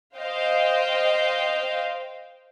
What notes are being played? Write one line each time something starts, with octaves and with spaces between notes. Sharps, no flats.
C5 D#5 F5 G5